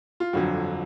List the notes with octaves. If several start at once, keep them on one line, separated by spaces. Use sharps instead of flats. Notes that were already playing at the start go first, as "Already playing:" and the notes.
F4
G1 F2 D3 F#3 F#4